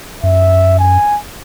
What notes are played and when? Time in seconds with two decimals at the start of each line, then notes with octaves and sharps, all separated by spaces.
0.23 F#2 E5
0.79 G#5